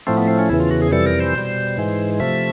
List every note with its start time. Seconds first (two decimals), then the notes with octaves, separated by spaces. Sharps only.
0.07 A2 F3 A3 C4
0.17 B3
0.28 C4
0.39 C#4
0.49 E2 C#3 E3 E4
0.60 F4
0.71 F#4
0.82 G#4
0.92 F2 C3 E3 G3 A4
1.06 A#4
1.20 C5
1.35 B2 G3
1.77 G#2 E3 G#3
2.20 C3 F3 A3 E5